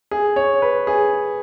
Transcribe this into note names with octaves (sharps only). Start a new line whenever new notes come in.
G#4
C#5
B4
G#4